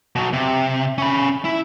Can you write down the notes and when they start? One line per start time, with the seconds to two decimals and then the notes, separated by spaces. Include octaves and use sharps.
0.16 B2 F#3
0.33 C3
0.98 C#4 B5
1.45 E4